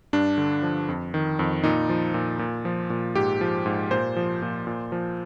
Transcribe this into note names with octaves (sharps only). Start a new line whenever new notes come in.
G2 D4
D3
F3
F2
D#3
F2
A#2 D#4
F3
A#2
A#2
F3
A#2
G#2 G4
F3
G#2
A#2 C5
F3
A#2
A#2
F3